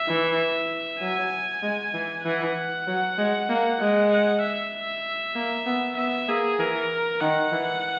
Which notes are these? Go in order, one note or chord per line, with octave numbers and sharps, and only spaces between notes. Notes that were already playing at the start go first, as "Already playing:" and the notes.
Already playing: E5
E3
F#3 G#5
G#3
E3
E3 F#5
F#3
G#3
A#3
G#3
F#5
E5
A#3
B3
B3 E5
A#3 G#4
E3 A#4
D#3 F#5
E3